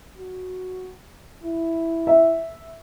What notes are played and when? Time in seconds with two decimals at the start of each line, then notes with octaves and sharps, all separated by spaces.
0.18 F#4
1.44 E4
2.07 E5